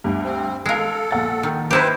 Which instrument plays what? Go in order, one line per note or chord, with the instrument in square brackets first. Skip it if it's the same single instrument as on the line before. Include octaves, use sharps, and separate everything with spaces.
[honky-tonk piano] D2 G2
[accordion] C4
[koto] G#3 A#4 [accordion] A4 [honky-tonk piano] F5 C7
[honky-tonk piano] A#1 F#5 A6
[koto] D#3
[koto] D#4 E4 G4 [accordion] B4 C5